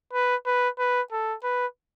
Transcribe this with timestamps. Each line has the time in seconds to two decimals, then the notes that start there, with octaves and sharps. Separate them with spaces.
0.13 B4
0.46 B4
0.79 B4
1.12 A4
1.44 B4